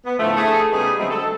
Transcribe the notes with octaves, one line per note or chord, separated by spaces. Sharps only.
B3
A2 D3 F3 A3
A3 G#4
C#3 G3 B3 D#4 G#4
D3 F#3 G#3 A3 C4 G#4
A4